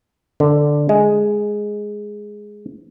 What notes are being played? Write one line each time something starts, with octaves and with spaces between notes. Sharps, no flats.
D3
G#3